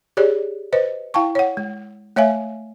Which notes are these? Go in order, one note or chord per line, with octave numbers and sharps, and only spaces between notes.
G4 G#4 C#5 D5
B4 C5 D#5
E4 F5 G5 A5 C#6
C#5 F#5
G#3
A3 C#5 E5 F5 G#5